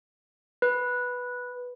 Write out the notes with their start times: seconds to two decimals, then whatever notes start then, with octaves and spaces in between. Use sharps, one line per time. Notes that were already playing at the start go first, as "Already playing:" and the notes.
0.62 B4